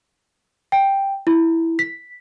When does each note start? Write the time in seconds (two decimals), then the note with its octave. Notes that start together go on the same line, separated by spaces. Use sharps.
0.72 G5
1.27 E4
1.79 B6